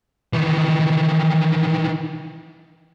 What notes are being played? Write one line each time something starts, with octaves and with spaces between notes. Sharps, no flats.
D#3 E3